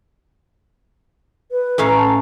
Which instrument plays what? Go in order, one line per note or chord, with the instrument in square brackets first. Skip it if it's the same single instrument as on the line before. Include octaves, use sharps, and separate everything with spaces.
[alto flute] B4
[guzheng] A2 C#4 F5 [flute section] A#5
[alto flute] A5